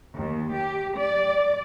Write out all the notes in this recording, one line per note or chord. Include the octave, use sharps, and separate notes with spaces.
D#2
G4
D5